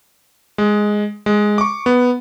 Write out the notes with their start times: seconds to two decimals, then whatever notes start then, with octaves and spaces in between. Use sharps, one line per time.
0.58 G#3
1.26 G#3
1.58 C#6 D6
1.86 B3